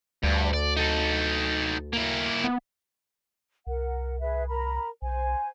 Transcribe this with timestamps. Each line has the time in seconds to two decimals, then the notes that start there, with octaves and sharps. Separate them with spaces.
0.24 D2 G2
0.54 D5
0.77 D#4 A4
1.93 A#3 E4
2.44 B3
3.67 C2 A#4 F#5
4.20 G#4 B4 E5
4.49 A#4 A#5 B5
5.02 B1 C5 G#5